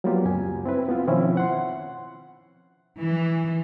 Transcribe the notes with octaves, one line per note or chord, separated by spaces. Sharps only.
F#3 G3 A#3 B3 F4 G4
C#2 F#2 G#5
C4 E4 B4
B3 C4 F4
B2 D#3 F3 C4 C#4 E4
F#5 C6
E3